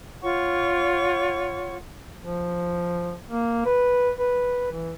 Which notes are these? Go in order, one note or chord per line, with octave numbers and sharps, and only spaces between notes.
F4 C#5 F#5 C#6
F3
A#3
B4
B4
E3